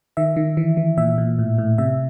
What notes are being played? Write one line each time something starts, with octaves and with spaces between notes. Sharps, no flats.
D#3 E5
D#3
E3
E3
A#2 E5
A#2
A2
A2
C3 E5